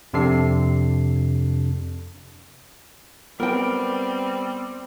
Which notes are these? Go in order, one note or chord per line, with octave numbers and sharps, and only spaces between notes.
F2 C3 C4 D4 A4 C7
G3 B3 C4 A#4 G5